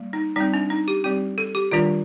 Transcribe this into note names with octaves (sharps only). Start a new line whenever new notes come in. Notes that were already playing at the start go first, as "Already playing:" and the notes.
Already playing: G3 A#3
D#4
G3 C4 D#4
D4
D#4
G4
G3 C4 G4
A4
G4
D#3 G3 D4 F4